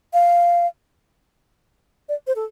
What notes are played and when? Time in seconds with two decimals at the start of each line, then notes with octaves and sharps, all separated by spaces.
0.13 F5
2.09 D5
2.27 C5
2.36 A4